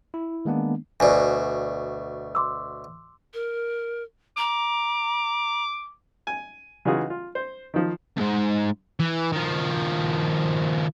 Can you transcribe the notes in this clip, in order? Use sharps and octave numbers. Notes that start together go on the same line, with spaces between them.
E4
D#3 G#3 A#3 B3 D4
D2 B2 D5 G#5
C6 D6 E6
A#4
A#5 D6
G#5
C#3 E3 D#4 F4 F#4 G#4
F4
C5
D#3 F3
C#2 G#2
E3
D#3 F3